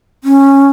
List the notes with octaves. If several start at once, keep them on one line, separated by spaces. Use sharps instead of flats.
C#4